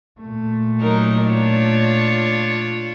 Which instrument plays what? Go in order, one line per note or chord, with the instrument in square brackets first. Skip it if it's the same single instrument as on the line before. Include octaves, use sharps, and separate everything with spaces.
[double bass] A#2 A3
[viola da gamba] F#3 D#4 A#4
D4 F4 C#5